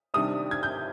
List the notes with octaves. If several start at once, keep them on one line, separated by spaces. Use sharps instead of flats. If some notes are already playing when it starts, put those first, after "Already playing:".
C3 D#3 G3 D4 D#6
G#6
G6